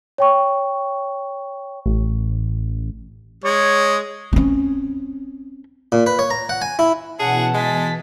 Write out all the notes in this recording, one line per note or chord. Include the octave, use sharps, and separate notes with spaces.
C#5 G5 C#6
A1
G#3 C#5
C4 C#4
A#2
B4
C#5
A#5
F#5
G#5
E4
B2 E3 C#4 G#4 F#5 A5
G#3 A6 B6